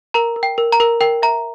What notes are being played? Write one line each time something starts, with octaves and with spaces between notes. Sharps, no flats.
A#4 A#5
A#4
G5
A#4
A#5
A#4
A#4 G5
E5 A#5